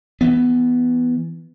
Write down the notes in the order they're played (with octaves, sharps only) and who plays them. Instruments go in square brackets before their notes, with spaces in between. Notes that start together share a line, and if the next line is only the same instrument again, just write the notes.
[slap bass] E3 B3